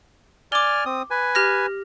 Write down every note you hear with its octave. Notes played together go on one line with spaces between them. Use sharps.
D5 G#5 D6 F6 G7
C4 D#6
B4 G#5
G4 F6 A#6